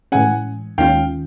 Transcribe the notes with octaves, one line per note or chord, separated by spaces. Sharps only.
A2 E3 G#3 C#4 F#5 G#5
D#2 D#3 G#3 C#4 F4 F5 G5